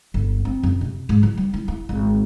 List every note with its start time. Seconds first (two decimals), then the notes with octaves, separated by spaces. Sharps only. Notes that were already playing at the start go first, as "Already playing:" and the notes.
0.14 G1
0.45 C4
0.63 F#2
0.81 C3
1.09 G#2
1.23 E3
1.37 G3
1.54 E4
1.68 E4
1.89 G#1